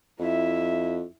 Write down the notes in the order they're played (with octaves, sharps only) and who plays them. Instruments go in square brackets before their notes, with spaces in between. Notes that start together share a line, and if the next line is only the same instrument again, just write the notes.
[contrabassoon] F2 [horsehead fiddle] E4 E5